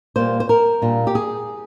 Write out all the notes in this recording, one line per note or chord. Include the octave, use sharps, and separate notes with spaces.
A#2 G3 A#3 C5
C5
A#4
A#2 G3 D4 F4
G4
G#4